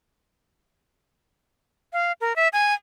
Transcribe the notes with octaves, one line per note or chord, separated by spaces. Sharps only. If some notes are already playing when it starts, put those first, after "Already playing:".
F5
A#4
E5
G#5